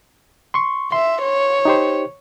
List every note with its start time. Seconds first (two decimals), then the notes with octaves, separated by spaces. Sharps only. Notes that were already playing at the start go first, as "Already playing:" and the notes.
0.54 C6 C#6
0.92 E5 C6
1.22 C#5
1.65 D#4 G4 C5